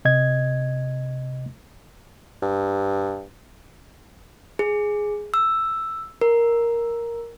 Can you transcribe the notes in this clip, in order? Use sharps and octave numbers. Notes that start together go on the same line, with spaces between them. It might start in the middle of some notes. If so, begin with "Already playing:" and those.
C3 D#5 G#6
G2
G#4
E6
A#4